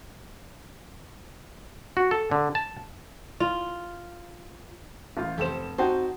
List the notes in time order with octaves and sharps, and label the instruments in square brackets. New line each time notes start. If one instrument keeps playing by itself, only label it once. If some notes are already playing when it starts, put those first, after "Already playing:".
[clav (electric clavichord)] F#4
A4
D3
A5
[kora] F4
[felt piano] A1 F4 F5
[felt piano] F1 E7 [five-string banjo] G4 A4 C5
[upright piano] C4 F#4 [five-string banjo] D#4 C5 [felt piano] G5 A5